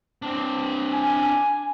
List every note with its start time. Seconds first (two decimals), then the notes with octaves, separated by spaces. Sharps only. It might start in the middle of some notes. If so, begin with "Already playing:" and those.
0.22 C4 D4
0.93 G#5